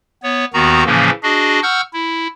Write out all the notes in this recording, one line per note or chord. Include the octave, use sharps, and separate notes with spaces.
B3 C#5
D#2 D#3 B3 F#4 A#5
A2 C#3 E3 F3 A#3 C#4
D4 F#4 G#4 D#5
F#5 C#6 E6 F6 G6
E4